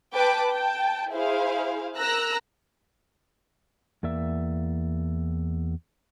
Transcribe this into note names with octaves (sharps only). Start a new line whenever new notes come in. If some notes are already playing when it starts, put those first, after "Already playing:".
B4 G5 A5 D6
G5 A5
E4 G#4 C5 F5
A#4 A#5 E6 F#6 A#6
E2 A#3 D5 E5